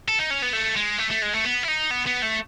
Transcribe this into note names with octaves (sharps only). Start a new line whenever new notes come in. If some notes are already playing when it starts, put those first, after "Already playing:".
A4
D#4
C#4
B3
A3
G#3
A3
A3
G#3
A3
B3
E4
D#4
B3
B3
A3